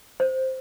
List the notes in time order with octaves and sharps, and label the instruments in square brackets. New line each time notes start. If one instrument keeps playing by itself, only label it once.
[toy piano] C5